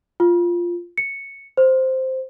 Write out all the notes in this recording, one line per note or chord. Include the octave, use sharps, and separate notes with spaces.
F4
C#7
C5